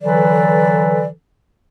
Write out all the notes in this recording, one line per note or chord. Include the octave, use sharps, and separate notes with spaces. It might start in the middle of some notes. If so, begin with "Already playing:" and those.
D3 E3 F#3 A4 B4 D5